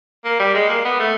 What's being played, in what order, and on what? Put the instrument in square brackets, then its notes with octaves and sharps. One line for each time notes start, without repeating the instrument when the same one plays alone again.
[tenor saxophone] A#3
G3
G#3
A#3
B3
A3